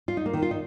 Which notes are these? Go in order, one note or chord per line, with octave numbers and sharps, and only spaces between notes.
F4
D#4
A#3
D#3
F4
D#4